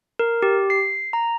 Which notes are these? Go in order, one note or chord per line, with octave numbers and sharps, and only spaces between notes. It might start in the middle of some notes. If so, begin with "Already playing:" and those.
A#4
G4
C7
A#5